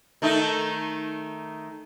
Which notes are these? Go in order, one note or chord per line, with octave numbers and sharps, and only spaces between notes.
D#3 A3 D#4